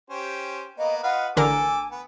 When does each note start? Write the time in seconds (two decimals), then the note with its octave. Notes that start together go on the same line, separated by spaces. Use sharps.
0.10 C#4 G4 C5
0.78 A#3 B3 D#5
1.03 F4 B4 D#5 F#5
1.37 A1 D3 A4 A#4 G#5 D6
1.91 B3